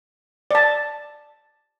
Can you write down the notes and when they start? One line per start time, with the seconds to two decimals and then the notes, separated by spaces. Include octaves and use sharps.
0.51 D5 A5